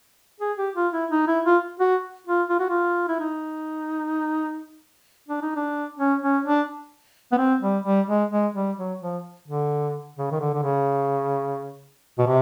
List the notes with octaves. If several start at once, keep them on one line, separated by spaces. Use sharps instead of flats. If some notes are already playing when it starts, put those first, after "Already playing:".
G#4
G4
F4
E4
D#4
E4
F4
F#4
F4
F4
F#4
F4
E4
D#4
D4
D#4
D4
C#4
C#4
D4
B3
C4
G3
G3
G#3
G#3
G3
F#3
F3
D3
C#3
D#3
D3
D3
C#3
B2
C3